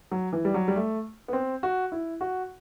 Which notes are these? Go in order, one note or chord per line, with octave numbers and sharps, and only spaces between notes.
F#3
E3
G3
F#3
G3
A3
B3
C4
F#4
E4
F#4